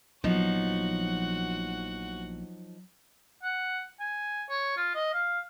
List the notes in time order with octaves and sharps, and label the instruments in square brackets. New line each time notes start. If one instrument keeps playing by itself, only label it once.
[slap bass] A#1 B3 [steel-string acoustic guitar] F3 D#4 [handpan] F#3 [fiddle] F#4 F#5
[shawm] F#5
G#5
C#5
F4
D#5
F5